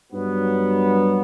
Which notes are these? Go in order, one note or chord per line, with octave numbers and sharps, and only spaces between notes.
G2 F#3 B3